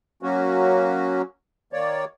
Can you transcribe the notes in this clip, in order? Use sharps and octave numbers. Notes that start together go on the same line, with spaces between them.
F#3 A#3 C#4 F#4
D#3 A#3 C#5 D5